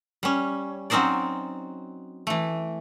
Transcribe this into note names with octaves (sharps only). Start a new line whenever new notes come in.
G3 C#4
F#3 C4 C#4 D#4 C5 D5
E3 A3